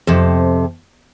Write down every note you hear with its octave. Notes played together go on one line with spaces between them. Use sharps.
F2 C3